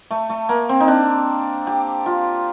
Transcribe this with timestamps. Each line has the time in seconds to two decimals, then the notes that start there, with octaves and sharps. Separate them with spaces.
0.11 A3
0.30 A3
0.49 A#3
0.69 C4
0.80 D#4
0.88 D4
1.67 G4
2.06 F4